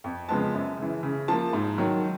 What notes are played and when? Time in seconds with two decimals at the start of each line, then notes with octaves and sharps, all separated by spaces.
0.04 F2
0.29 C#3 F3 G#3 B3 A5
0.53 F#2
0.79 C#3 E3
1.03 C#3
1.28 F3 A#3 A5
1.53 G#2
1.78 D#3 F#3